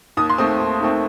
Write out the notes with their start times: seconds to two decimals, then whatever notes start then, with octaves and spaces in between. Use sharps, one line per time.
0.17 D#2 D#6
0.30 C6
0.38 D#3 A3 C4 D#6
0.60 D#2
0.80 D#3 A3 C4